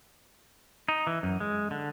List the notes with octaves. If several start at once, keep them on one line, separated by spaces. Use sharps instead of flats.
D#4
E3
F#2
G#3
D3